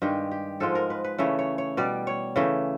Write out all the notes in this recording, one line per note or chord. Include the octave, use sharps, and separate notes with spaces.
G2 D#3 G#3 G4
G4
G#2 F3 G#3 A4
A#4
B4
B4
C#3 E3 A3 C#5
C#5
C#5
B2 G3 D5
C#5
C#3 E3 A3